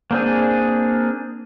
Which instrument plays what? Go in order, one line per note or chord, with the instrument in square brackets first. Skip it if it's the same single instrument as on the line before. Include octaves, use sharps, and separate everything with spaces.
[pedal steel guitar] A#3 C4 D4 G#4